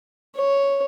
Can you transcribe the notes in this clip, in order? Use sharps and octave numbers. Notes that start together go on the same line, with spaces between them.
C#5